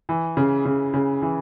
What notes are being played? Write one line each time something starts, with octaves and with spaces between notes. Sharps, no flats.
E3
C#3
C#3
C#3
E3